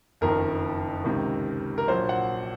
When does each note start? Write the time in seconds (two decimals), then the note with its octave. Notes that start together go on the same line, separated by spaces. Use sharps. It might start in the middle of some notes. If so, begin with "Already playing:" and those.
0.21 F#1 F2 D#3 A#4
1.04 C#2 C3 D#3
1.78 A#4
1.88 A#1 A#2 F#3 C5
2.09 F#5